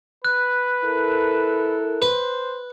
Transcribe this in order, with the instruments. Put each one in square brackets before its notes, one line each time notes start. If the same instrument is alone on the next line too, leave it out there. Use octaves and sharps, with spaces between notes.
[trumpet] B4 [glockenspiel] F#6
[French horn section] E4 A4 A#4
[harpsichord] B4 [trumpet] C5